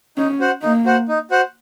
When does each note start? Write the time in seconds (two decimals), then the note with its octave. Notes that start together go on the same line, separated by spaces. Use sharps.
0.17 C#4 D#4
0.40 F#4 C5 F#5
0.62 A#3 D#4
0.85 F#4 C5 F#5
1.08 D#4
1.31 F#4 C5 F#5